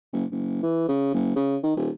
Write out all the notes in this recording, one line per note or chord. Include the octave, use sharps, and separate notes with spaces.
F#1
F#1
E3
C#3
F#1
C#3
D#3
D#1